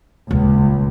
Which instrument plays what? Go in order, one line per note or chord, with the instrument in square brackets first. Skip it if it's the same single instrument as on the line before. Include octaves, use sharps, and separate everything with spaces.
[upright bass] D#1 [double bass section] C#2